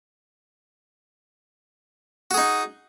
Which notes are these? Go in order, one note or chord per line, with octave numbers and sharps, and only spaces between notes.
D#4 F#4 G#4